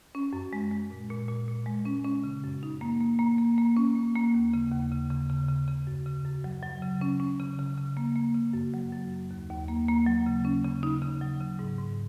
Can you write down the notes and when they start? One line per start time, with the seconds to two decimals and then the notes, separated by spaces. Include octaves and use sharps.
0.15 C#4
0.33 F#2
0.53 G#3
0.71 G#3
0.90 A#2
1.10 A#2
1.28 A#2
1.48 A#2
1.66 G#3
1.85 C#4
2.04 C#4
2.24 C#3
2.44 F#2
2.63 D#4
2.81 A#3
3.01 A#3
3.19 A#3
3.38 A#3
3.58 A#3
3.77 C#4
3.95 A#3
4.15 A#3
4.34 D#2
4.54 C#3
4.72 D#2
4.91 C#3
5.10 C#3
5.30 C#3
5.49 C#3
5.68 C#3
5.87 F#2
6.06 C#3
6.25 F#2
6.44 F#3
6.63 F#3
6.82 C#3
7.01 C#4
7.20 C#4
7.40 C#3
7.59 C#3
7.78 C#3
7.97 A#3
8.16 A#3
8.35 C#3
8.53 F#2
8.74 F#3
8.92 F#2
9.12 F#2
9.31 D#2
9.50 D#2
9.68 A#3
9.88 A#3
10.06 F#3
10.26 C#3
10.45 C#4
10.64 C#3
10.83 D#4
11.02 C#3
11.21 F#3
11.41 C#3
11.59 G#2
11.78 G#2